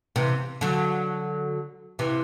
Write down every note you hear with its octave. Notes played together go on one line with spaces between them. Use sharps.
C3 E3
D3 F#3
C3 E3